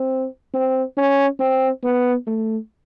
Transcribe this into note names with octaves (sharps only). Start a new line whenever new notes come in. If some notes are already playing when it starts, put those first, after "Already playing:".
Already playing: C4
C4
C#4
C4
B3
A3